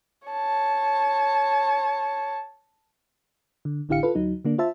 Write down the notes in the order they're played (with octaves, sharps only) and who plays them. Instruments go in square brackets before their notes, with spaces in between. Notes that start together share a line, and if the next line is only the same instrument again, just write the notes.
[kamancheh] C#5 A5
[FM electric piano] D3
A1 D3 E4 G4 F5 C#7
F4 A4 B4
D2 F#3 D#4
D3 A#3 D4
F4 C5 E5 A5